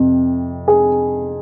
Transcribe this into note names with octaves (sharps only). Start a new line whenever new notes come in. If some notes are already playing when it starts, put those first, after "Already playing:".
Already playing: F2 C3
G#4